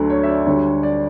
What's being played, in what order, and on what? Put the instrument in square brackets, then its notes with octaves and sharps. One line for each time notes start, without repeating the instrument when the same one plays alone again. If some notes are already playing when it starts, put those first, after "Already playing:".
Already playing: [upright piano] D2 D3 F#3 A3
C#5
E5
D5
D2 D3 G3 C#5
D5